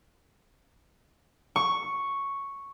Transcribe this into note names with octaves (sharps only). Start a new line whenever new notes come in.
C#6